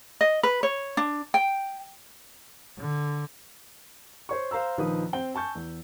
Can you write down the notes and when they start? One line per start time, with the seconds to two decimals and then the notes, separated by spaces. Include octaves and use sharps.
0.21 D#5
0.43 B4
0.63 C#5
0.97 D4
1.34 G5
2.78 D3
4.29 C5 C#5 C#6
4.51 C5 F5 A#5 E6
4.77 A#1 D#3 F3 B4 D#6
5.13 C4 G5 G7
5.34 G#5 A5 C#6 G6
5.55 E2